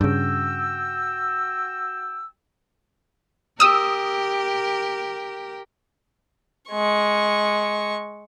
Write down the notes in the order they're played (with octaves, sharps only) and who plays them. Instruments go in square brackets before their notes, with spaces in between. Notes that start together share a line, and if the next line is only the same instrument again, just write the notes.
[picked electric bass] G2 C#3 [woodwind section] F#4 G5 E6
[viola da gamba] G4 A#4 [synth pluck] D#6 E6
[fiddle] G#3 C#6